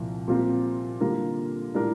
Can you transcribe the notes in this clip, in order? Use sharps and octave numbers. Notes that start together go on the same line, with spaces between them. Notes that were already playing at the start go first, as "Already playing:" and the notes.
Already playing: C2 A#2 F3
A#2 G3 C4 F4 A#4
D3 G3 A#3 F4 A#4
A2 G3 D4 F4 A#4